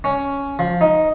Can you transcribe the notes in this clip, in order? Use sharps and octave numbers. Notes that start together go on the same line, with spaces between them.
C#4
F3
D#4